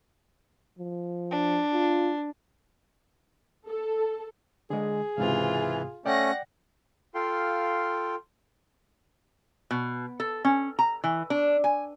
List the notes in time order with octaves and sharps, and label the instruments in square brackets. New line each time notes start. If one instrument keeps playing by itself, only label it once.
[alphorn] F3
[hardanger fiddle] D4
[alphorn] F4
[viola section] A4
[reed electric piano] D3 G#3 [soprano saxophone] G#4
[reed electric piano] C#2 G#2 C3 [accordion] E3 [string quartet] F4
[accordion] A3 C#4 [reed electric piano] D5 G5 [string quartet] F#5 A#6
[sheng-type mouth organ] F4 A4 F5 G5 C6
[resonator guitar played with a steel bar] B2
A4
C#4
A#5
E3
D4
G#5